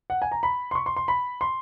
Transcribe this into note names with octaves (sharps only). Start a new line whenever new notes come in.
F#5
G#5
A#5
B5
C6
C#6
C6
C6
B5
C6